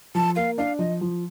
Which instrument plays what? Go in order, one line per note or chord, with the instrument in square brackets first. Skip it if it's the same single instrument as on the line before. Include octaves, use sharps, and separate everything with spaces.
[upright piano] F3 [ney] A5
[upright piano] A#3 [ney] F5
[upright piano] D4 [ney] F5
[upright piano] F3 [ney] D#5
[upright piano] F3